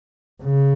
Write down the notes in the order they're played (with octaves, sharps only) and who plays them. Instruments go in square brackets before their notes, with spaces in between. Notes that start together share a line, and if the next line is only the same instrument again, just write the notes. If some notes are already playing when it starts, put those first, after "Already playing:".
[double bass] C#3